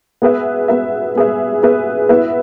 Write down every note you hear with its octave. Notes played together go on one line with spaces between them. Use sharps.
B3 G#4 B4 E5
B3 G#4 B4 E5
B3 G#4 B4 E5
B3 G#4 B4 E5
B3 E4 B4 E5